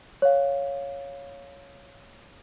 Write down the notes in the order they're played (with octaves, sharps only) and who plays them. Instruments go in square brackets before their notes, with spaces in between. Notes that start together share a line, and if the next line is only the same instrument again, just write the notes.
[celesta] C#5 F5